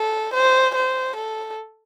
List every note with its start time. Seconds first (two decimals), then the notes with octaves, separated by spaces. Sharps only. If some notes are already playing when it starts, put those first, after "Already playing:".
Already playing: A4
0.34 C5
0.75 C5
1.16 A4